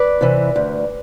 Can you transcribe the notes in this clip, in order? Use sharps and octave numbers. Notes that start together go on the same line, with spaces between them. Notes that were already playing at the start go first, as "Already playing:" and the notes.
Already playing: B4 D5
C3 E3
D2